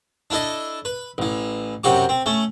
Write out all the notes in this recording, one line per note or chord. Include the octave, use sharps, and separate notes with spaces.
D4 E4 A4 D#5
B4
A1 E3
F#2 C3 F#4 G4 D6
C4
A3 C#4